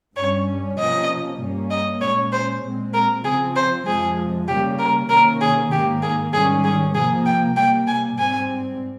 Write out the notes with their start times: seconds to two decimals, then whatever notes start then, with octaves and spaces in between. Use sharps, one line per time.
0.16 G2 G3 C#4 C#5
0.78 C3 F3 A#3 C#4 D#5
1.40 G2 G3 A#3 C#4
1.70 D#5
2.01 A#2 G#3 C#4 C#5
2.32 C5
2.63 A#2 G#3 C4
2.94 A#4
3.24 C#3 F3 C4 G#4
3.56 C5
3.86 F2 C3 F3 G#3 G#4
4.48 C#3 G3 A#3 C#4 G4
4.79 A#4
5.09 C3 D#3 A#3 C#4 A#4
5.41 G#4
5.71 G#2 D#3 A#3 G4
6.02 G#4
6.33 G#2 D#3 G3 C#4 G#4
6.64 G#4
6.94 C3 F3 A#3 G#4
7.25 G5
7.56 C3 G3 A#3 G5
7.87 G#5
8.17 G#2 G3 C4 G#5